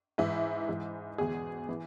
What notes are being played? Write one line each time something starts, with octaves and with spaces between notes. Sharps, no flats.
G#2 E3 E4
G#2 E3
E2 B2 G#4
E3